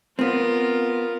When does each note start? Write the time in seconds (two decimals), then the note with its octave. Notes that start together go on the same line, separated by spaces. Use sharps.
0.19 B3 C4 F4 A#4